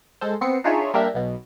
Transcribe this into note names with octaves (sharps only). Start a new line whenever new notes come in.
G#3 A4 C5
B3 C4 C7 C#7
D4 D#4 F4 G#4 C#5 E5
G3 A#3 D4 G4 A#4 E5
B1 B2